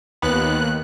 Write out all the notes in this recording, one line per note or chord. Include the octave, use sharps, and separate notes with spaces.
D#2 B3 F#6